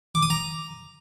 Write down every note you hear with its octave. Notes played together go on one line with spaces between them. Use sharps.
D6
D#6
A#5